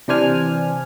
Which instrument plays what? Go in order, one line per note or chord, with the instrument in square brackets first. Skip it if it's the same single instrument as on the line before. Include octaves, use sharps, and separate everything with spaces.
[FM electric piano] C3 E3 D4 C5 G#5 F6